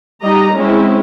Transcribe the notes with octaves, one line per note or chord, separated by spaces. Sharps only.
G3 D#4 G4 D#5 A#5
G#3 C4 C#4 E4